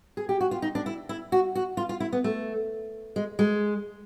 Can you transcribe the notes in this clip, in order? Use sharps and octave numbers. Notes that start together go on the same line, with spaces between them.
G#4
G4
F#4
F4
D#4
D4
E4
E4
F#4
F#4
F4
F4
E4
B3
A3
G#3
G#3